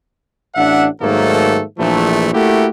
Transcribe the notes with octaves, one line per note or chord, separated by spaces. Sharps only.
A1 D4 E5 F#5
G#2 D#3 F#3 A3 A#3 A4
A#1 E3 A3
A3 A#3 E4 F#4 G4